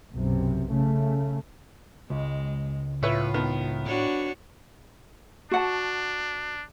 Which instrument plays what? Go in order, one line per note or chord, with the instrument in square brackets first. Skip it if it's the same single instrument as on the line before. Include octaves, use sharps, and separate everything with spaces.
[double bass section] B1 F#2 C3
C#3 A3
[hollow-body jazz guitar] C#2 [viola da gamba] G#3
[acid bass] A2 [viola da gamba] F4 [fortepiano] B4 C#5 E5
[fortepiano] D#3 B3 F6
[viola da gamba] D4 F#4 C#5
[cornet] D4 [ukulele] F#4 F#5 A5